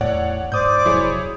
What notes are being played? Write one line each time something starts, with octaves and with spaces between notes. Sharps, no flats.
E2 A2 C#5 D5 F#5
G#2 C5 D5 D6 D#6 G6
F1 F#3 E4 G#4 C#5